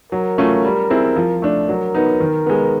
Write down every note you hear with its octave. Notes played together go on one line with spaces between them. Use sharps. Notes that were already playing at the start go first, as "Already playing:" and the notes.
F#3 A#4
A3 C#4 F4
G3
C4 E4 G#4
F3
A3 D4
F#3 A#4
B3 D#4
D#3
G#3 B3